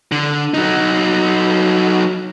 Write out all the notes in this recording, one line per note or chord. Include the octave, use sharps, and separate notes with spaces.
D3
F#3 D#4